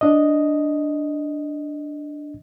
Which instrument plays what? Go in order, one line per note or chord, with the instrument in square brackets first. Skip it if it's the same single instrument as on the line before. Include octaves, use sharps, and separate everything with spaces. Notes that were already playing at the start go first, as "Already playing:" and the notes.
[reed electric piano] D4 D#5